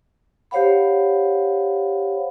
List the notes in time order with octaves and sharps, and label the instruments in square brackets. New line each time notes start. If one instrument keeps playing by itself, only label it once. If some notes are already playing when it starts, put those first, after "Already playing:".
[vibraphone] G4 C5 C#5 F5 F#5 B5